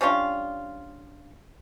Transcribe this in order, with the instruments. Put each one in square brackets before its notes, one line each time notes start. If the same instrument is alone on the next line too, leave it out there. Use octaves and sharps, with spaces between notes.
[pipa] G3 C#4 D4 F4